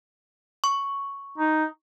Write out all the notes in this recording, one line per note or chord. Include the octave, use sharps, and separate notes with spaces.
C#6
D#4